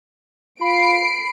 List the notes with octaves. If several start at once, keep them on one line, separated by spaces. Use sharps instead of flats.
F4 B5 C7 D7